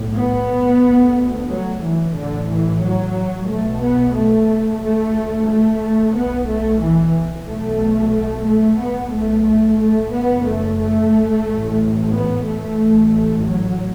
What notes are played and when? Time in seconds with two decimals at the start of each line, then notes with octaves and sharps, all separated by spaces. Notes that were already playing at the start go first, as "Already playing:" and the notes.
Already playing: B1 A2
0.17 B3
0.83 D2
1.50 F#3
1.83 E3
2.16 A1 A2 D3
2.49 E3
2.82 F#3
3.49 B1 B2 A3
3.82 B3
4.15 A3
4.82 D2 A3
5.49 A3
6.15 B1 B2 B3
6.49 A3
6.82 E3
7.47 B1 B2 A3
8.14 A3
8.48 A3
8.81 B1 A2 B3
9.14 A3
9.47 A3
9.81 A3
10.13 F#1 F#2 B3
10.47 A3
10.81 A3
11.46 A1 A2
12.13 B3
12.47 A3
12.80 A1 A2
13.46 F#3